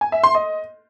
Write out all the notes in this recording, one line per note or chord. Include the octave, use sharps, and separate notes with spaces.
G#5
E5
C6
D#5